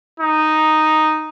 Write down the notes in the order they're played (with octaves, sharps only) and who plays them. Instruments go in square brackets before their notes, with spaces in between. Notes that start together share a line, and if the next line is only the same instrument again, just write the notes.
[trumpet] D#4